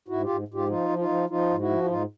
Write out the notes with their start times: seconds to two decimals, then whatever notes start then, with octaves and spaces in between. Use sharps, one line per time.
0.08 G#2 E4 F#4
0.23 F4 G4
0.29 G#2
0.48 G#2
0.54 F4 G4
0.68 F3 D#4 F4
0.89 F3
0.98 D#4 F4
1.08 F3
1.29 F3 D#4 F4
1.50 G#2
1.59 E4 F#4
1.69 F3
1.84 E4
1.89 G#2 D#4 F4